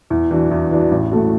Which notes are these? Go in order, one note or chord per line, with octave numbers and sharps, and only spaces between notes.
E2
E3 D4 F#4
E2
E3 D4 F#4
A1
A2 A3 F#4